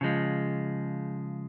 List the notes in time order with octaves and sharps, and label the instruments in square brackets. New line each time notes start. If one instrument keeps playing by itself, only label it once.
[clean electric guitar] C#3 F3 G#3